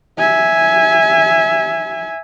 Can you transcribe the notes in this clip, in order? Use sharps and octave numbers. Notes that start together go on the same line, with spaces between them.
E5 G#5